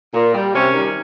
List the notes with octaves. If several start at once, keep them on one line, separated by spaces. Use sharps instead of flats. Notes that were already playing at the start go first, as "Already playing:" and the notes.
A#2
G3
C3 C#4
D#3 G3